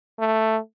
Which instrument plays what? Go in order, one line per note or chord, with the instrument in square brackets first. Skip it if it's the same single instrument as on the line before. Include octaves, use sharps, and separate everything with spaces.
[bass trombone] A3